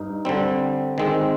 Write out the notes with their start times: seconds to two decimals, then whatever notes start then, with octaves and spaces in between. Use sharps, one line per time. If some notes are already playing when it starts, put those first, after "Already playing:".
Already playing: G2 D#4
0.25 D3 G3 C4
0.98 D#3 G#3 C4